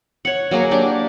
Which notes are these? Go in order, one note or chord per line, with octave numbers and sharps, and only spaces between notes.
C#5 F#5
F#3 A#3 G#4 A#4
D4 G4 D6